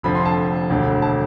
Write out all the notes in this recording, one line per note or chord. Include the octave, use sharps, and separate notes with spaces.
F1 F2 D3 F3 B5
C6
A5
E1 D2 D3
A5